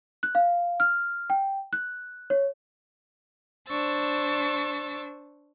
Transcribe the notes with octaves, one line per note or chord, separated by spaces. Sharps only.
F#6
F5
F6
G5
F#6
C#5
D4 C5 C#6 E6 A6